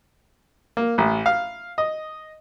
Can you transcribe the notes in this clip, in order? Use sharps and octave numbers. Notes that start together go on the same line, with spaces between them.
A#3
A1
F5
D#5